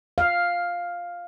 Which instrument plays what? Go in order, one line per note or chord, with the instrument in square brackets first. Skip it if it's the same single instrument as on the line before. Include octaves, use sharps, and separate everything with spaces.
[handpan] F5